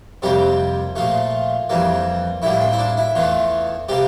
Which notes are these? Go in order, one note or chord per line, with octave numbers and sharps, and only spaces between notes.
F2 C3 G3 A#3 G4
A#2 F3 A3 F4
F2 E3 G3 A#3
A2 G3 A#3 E4
C4
E4
D4
E4
E2 E3 A3 F4
C3 G3 A#3 G4